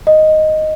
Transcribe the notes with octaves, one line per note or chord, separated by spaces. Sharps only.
D#5